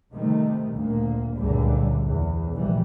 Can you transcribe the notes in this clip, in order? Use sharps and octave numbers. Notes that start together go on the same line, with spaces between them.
C3 D#3 G3 A3
D2 A#2 A#3
C#2 F#2 A#2 D3 G3
E2
F1 A#1 E3 G3